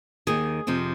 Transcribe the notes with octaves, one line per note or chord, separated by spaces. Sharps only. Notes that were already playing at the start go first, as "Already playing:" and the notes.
D#2 D#3 G#4
F2 C3 F3